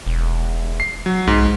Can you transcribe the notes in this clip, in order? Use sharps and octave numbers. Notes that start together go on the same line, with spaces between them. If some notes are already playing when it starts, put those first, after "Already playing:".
E1
C7
F#3
B1 G#2